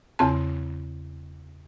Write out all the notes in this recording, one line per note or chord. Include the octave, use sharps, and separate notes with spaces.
E2 C#3 C4 A5